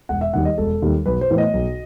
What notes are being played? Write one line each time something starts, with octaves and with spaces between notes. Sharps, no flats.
E1 F#5
E5
D#2 D#3 G3 F#5
D#5
E1 A4
D#2 D#3 G3
B1 B4
C5
A2 E3 B3
D#5
B1